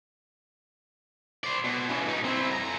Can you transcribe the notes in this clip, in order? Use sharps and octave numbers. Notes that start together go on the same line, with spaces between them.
C5 D5
B2
C#3 E3
B2 D#4
C4 E4
F2 A#5